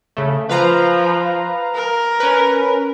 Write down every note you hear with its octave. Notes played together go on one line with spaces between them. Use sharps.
C#3 A3
F3 B4 F5 A#5
A#4
C#4 B4